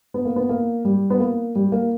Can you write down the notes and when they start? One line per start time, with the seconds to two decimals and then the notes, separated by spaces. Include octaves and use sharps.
0.14 B3
0.25 A#3
0.36 B3
0.49 A#3
0.85 G3
1.10 B3
1.19 A#3
1.55 G3
1.72 A#3